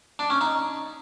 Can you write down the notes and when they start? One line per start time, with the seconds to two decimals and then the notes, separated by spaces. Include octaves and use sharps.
0.19 D4
0.30 C#4
0.41 D#4